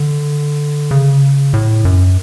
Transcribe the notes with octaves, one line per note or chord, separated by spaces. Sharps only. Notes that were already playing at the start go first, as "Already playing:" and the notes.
Already playing: D3
C#3
A2
F#2